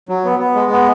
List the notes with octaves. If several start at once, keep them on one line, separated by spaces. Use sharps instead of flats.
F#3
B3
B3
G#3
B3